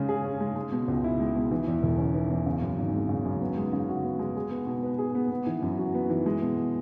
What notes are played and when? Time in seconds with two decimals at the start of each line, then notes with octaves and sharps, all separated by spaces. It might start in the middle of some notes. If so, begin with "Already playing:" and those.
Already playing: C#3 G#3 C#4
0.09 G#4
0.24 C#4
0.40 G#3
0.56 G#3
0.72 B2
0.88 C#2
1.04 E4
1.20 G#3
1.35 B2
1.51 E3
1.67 E2
1.83 E1
1.98 C#4
2.14 E3
2.30 E2
2.46 C#3
2.62 F#2
2.78 G#1
2.93 G#3
3.09 C#3
3.25 F#2
3.41 B3
3.57 G#3
3.73 C#3
3.89 F#4
4.04 B3
4.19 G#3
4.36 G#4
4.51 B3
4.67 B2
4.83 B4
4.99 G#4
5.15 B3
5.31 B3
5.46 E3
5.62 F#2
5.78 F#4
5.94 B3
6.10 E3
6.26 G#3
6.41 B2